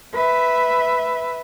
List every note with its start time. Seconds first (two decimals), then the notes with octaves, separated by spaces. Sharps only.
0.14 B4 E5